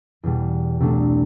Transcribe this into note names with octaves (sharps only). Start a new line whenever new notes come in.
E2 B2 G3
C2 B2 A3 D4